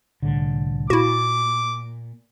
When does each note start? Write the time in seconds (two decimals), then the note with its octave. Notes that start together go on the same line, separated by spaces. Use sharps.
0.22 C2 A2 D3
0.90 A#2 E4 F#4 D6